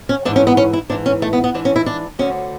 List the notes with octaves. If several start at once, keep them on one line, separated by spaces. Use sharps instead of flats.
C#4
G#2 E3 D4
C#4
B3
C#4
E4
G#2 E3 D4
C#4
A3
B3
B3
G#2 E3 D4
C#4
E4
D4
D2 D3 C#4